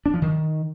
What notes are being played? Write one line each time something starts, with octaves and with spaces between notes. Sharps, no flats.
D4
F3
D#3